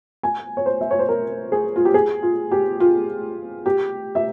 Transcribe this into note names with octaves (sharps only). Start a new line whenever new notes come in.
G#5
C#5
C5
E5
C#5
C5
A#4
G#4
F4
G4
G#4
F4
G4
F4
G4
E5